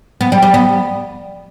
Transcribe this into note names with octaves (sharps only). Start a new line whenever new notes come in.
B3
G3
G3
B3